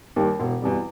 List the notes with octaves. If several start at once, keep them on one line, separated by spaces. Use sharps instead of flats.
D#2 D#3 G3
E1
E2 B2 G3